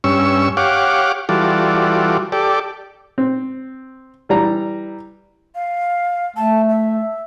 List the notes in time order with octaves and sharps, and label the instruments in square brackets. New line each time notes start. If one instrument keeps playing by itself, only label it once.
[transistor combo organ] G2 C#4 C#6 E6
G4 C#5 F5 F#5 D6
E3 G3 F4 F#4 A4 D5
G4 A4 D5
[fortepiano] C4
E3 G3 A#5
[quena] F5
[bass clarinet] A3 [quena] A5
[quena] E5